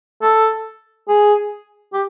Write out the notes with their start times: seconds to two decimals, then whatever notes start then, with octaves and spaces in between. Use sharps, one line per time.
0.22 A4
1.08 G#4
1.93 G4